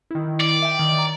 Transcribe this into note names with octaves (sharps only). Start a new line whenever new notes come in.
D#3 E4
D5
E5 G5
D#3
A#5